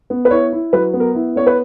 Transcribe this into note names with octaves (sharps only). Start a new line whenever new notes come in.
B3
B4
E4 C#5
E4
F#3 B4
B3
A#4
E4
B3 C#5
B4